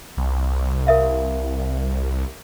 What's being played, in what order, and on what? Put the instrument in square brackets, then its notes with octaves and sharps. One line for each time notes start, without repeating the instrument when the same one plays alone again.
[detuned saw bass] C2
[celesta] A#4 E5 F5